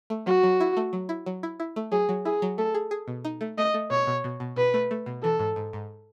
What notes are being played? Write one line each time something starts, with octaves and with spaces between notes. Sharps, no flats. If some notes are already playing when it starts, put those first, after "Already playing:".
A3
F#3 F#4
F#3
E4
A3
F#3
E4
F#3
E4
E4
A3
F#3 G#4
F#3
E4 G#4
F#3
A3 A4
G#4
G#4
B2
D#4
A3
A3 D#5
A3
B2 C#5
B2
B2
B2
B2 B4
A3
A3
B2
E3 A4
G#2
G#2
G#2